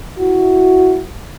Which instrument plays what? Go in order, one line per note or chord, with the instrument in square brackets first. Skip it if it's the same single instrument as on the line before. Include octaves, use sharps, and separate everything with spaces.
[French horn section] E4 F#4